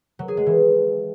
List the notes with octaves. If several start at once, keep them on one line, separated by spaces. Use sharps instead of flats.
F#3
G#4
G#3
E3